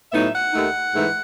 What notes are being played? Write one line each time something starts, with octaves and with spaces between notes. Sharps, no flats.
A2 F#3 B3 D#4 E5
F#5
D#2 D#3 A3 D#4
G#2 E3 A3 D#4